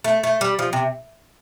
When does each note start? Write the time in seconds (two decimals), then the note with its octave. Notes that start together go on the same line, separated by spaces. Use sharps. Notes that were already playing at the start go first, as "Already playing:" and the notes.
0.04 A3
0.23 A3
0.41 G3
0.59 F3
0.73 C3